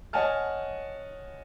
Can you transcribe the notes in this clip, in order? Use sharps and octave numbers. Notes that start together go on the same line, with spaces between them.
C#5 D#5 F#5 G#5 A5 F6